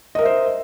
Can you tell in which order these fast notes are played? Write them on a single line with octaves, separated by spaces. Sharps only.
D#5 A#4 E5 C5